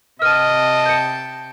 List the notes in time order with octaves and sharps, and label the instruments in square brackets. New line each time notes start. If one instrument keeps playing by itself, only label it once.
[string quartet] C3 G5 A5 [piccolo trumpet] D#5 [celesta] F6 D#7
[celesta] G6 C#7